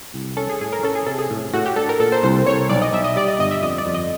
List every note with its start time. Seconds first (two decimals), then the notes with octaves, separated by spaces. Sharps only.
0.14 C2
0.37 C#4 A4
0.49 G#4
0.61 A2 G#4
0.73 A#4
0.83 C#4 A4
0.95 G#4
1.07 C3 A4
1.19 G#4
1.30 A2
1.53 A2 F#4
1.66 G4
1.76 D4 A4
1.89 A#4
2.00 A#2 A4
2.12 C5
2.23 C2 C5
2.46 C2 C#5
2.69 B1 D5
2.82 D#5
2.93 B1 E5
3.04 D#5
3.16 G3 D5
3.28 D#5
3.39 G1 D#5
3.51 E5
3.62 F2 D#5
3.78 D5
3.86 F2
3.94 D#5